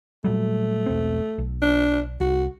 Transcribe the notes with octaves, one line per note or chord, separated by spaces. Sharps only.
A#2 F#3 G3 A3
E1 B1 C4
B1
D4
C2 F#4